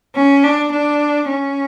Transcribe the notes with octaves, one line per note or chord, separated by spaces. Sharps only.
C#4
D4
D4
C#4